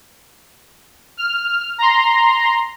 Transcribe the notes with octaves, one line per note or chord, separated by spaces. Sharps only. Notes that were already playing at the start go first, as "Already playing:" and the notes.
F6
A#5 C6